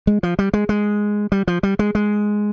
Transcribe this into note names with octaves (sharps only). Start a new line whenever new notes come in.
G#3
F3
G3
G#3
G#3
G3
F3
G3
G#3
G#3